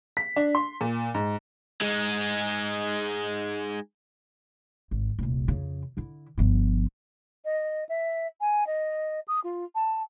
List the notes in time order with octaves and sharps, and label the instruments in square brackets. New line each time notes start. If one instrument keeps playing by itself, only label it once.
[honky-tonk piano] B6
D4
C6
A#2
G#2
[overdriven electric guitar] G#3 D#4
[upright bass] G#1
D#1 C2
F2 C#3
D3 E4
G1 F3
[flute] D#5
E5
G#5
D#5
D#6
F4
A5